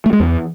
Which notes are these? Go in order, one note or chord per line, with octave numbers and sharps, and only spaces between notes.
A3
G#3
E2